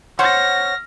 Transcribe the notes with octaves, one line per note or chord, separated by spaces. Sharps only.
C5 C#5 F#5 F6 A#6